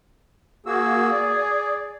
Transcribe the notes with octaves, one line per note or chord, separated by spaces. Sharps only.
A#3 F#4 G#4 E6
D5